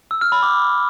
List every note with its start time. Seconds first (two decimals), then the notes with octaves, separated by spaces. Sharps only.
0.11 E6
0.21 F6
0.32 B5
0.43 D6